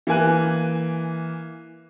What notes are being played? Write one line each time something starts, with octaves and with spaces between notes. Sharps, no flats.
E3 A#3 G#5 F#6